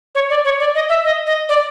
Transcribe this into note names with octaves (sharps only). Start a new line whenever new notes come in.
C#5
D5
C#5
D5
D#5
E5
D#5
D#5
D5